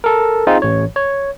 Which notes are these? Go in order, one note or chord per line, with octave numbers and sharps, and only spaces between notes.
A4 A#4
C4 D#4 F4 G#4
A1 C#5
C#5